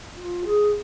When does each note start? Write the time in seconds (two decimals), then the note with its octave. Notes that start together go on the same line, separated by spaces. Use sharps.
0.16 F4
0.45 G#4